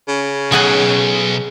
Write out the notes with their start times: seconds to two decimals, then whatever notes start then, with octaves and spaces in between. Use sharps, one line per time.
0.08 C#3
0.52 B1 G#4 F#5 G#5